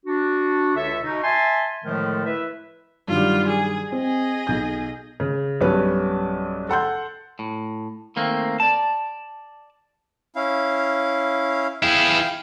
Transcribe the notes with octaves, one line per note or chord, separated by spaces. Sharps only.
D4 F#4
C#2 D3 A4 C#5 E5
B2 D#4
E5 G#5 A5 C6
A2 D3 D#3 F3 G#3 A3
E4 B4 E5
G2 D#3 F#3 G3 F4
G#4
C4 G#4 D#5
B1 G6
C#3
B1 G2 C#4 B4
A4 F#5 C6 G6
A2
D#3 A3 A#3 C4
D5 A5
C#4 E4 F5
E4 G#4 F5 G5